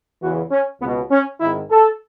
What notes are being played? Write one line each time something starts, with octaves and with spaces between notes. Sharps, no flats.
E2 C#3 E3 F#4
C#4
C#2 B2 B3
C#4
G#1 G#2 D#3 E4
A4